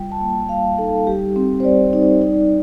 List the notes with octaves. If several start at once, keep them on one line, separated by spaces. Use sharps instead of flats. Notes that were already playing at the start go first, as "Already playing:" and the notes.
Already playing: G3 F4 G5
A5
A#3
A5
G3 F5
D#4 A4
G3 G4
C4
C5
G3 D5
D#4
D#4